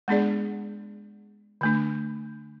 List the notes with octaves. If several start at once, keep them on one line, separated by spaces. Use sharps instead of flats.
G#3 B3 D4 G#4 D5
D3 A3 D4